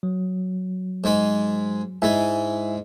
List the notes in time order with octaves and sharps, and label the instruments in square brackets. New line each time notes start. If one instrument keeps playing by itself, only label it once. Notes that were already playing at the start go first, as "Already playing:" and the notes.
[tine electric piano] F#3
[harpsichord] G#2 G#3
[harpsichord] G#2 G#3 [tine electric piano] E4 E5 G#5